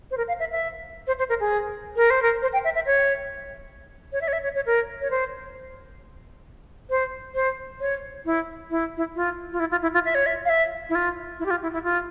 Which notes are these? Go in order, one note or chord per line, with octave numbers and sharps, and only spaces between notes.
C5
A#4
F5
E5
E5
C5
C5
A#4
G#4
A#4
C5
A#4
C5
G5
E5
E5
C#5
C#5
E5
C#5
E5
C#5
C#5
A#4
C#5
C5
C5
C5
C#5
E4
E4
E4
F4
F4
E4
F4
E4
F4
E5
C#5
E5
F5
E5
E4
F4
E4
G4
F4
E4
E4
F4